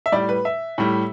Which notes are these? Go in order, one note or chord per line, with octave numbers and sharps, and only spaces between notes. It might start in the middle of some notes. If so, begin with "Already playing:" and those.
E5
A2 G3 D5
B4
E5
A2 G3